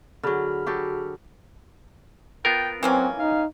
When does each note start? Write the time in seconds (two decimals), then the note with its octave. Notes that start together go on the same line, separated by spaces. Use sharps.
0.23 D3 F#3 G#4 B5 F6
0.66 F#3 G4 A4
2.45 B3 F4 A#4 G5
2.83 E3 F#3 A#3 C4 C#4
3.19 D#4 F5